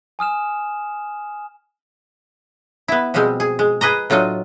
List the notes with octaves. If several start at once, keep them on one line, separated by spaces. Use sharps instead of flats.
G#5 D#6 F6 E7
B3 E4
B2 F3 G3 G#3 C4
G#4
G#3
G#4 B4 D#5 A#5
A2 F#3 D4 F4 D#5